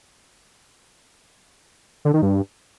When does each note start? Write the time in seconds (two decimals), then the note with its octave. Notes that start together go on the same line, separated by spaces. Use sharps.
2.05 D3
2.14 D#3
2.22 G2